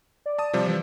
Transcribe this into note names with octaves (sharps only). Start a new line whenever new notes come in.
D5
A5 D#6
C3 F3 G3
E3